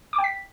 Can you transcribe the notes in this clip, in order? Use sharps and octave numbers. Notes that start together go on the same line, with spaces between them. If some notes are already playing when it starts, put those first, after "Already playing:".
D6
G5
B6